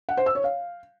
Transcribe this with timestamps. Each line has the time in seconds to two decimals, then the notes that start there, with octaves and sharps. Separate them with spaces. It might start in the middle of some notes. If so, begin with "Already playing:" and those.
0.09 F#5
0.17 C5
0.26 E6
0.35 C#5
0.44 F5